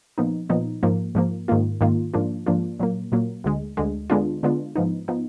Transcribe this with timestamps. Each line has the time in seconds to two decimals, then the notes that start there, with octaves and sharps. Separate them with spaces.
0.18 A#2 F3 B3 D#4
0.50 A#2 F3 B3 D#4
0.83 G#2 F3 A#3
1.15 G#2 F3 A#3
1.48 G#2 D#3 A#3 F4
1.81 G#2 D#3 A#3 F4
2.14 G#2 F3 A#3 D4 F4
2.46 G#2 F3 A#3 D4 F4
2.80 A#2 F#3 A#3
3.12 A#2 F#3 A#3
3.44 D2 D3 G#3
3.77 D2 D3 G#3
4.10 D3 G#3 B3 D4 F4
4.43 D3 G#3 B3 D4 F4
4.76 G#2 F3 B3 D#4
5.08 F3 B3 D#4